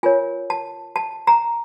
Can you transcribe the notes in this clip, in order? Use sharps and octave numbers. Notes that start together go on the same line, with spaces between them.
F4 A#4 C#5 G#5
A5
A5
A#5